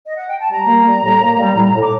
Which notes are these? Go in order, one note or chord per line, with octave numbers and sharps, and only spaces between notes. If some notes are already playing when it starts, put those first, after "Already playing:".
D#5
F#5
G5
A5
G3 A#5
A#3
G3
A2
A#3
G3
A2
A2
D6